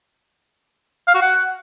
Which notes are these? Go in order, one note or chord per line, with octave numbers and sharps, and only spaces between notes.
F5
F#4
F#5